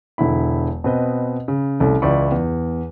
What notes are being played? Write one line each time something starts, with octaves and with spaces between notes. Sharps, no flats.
E1 D3 E4 B5
B2 C4 B4 D#5
C#3
C2 A3 C#4 A4
C#2 E3 E4 D5 B5 C#6
E2